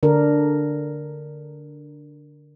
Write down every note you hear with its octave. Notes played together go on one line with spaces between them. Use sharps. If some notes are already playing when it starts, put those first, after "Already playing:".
D3 D4 A#4